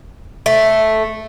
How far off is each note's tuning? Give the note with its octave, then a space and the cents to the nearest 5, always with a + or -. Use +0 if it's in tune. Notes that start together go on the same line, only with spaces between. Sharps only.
A3 -5